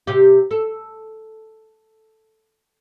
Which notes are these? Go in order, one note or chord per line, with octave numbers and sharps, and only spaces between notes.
C3 G4
A4